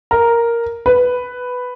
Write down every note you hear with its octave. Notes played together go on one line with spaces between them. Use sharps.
A#4
B4